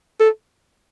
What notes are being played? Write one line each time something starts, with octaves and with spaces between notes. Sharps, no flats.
A4